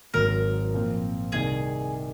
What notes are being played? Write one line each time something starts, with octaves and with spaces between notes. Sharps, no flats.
G#1 G#2 F#3 A#4
A#2 F3 C4
C2 C3 D#3 G#4